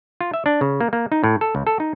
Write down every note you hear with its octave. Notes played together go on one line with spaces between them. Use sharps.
F4
E5
D4
C#3
A#3
A#3
D#4
A2
A4
C#2
A4
D#4